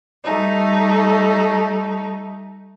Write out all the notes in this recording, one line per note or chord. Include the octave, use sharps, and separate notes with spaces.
G3 A3 D#4